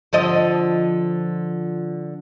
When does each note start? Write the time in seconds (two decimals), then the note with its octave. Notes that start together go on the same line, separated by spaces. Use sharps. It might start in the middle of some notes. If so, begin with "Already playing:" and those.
0.13 D3 F3 D#5